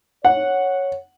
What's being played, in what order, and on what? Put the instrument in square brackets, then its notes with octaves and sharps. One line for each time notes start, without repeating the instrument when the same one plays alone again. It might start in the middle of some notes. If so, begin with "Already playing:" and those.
[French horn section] C#5 [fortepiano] F#5